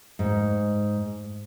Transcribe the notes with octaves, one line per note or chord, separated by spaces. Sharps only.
G#2